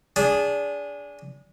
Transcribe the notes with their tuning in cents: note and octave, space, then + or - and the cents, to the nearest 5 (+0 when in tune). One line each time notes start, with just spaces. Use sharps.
D4 -25 G#4 -10